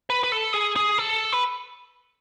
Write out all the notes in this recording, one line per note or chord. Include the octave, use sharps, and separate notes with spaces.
B4
B4
A4
G#4
G#4
A4
B4